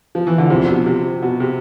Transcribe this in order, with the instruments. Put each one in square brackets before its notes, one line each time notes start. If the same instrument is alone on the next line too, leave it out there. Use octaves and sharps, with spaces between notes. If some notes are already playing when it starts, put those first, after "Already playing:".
[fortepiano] F3
E3
D3
[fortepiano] C3 [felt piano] F3 C4 G4
[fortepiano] B2
C3
B2
C3